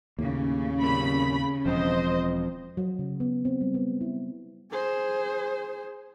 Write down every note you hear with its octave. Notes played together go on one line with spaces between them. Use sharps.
D#2 A2 C#3 A#3
C4 G4 A#4 B5
E1 F3 C4 F4 C5 D#5
F#3
C#3
B3
C4
G3
B3
E4
G#4 C5